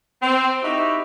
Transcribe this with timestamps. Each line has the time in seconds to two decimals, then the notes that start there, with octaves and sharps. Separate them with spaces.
0.22 C4
0.63 D#4 E4 F#4 G4 E5